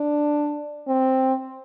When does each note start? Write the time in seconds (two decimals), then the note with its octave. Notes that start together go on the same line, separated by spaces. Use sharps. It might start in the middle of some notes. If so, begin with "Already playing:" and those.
Already playing: D4
0.88 C4